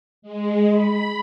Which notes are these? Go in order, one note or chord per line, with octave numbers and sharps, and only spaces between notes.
G#3
B5